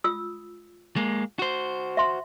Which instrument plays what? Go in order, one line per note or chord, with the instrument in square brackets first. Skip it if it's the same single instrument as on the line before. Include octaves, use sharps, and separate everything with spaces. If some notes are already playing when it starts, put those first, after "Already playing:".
[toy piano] F4 D#6 E6
[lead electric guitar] G#3 A#3
F#4 C5
[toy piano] E5 C6